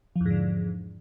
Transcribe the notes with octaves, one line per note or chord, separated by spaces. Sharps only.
E2 G#2 D3 F3